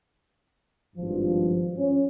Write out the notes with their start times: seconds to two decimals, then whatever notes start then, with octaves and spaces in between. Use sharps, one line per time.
0.96 G#1 G2 F3
1.76 C#4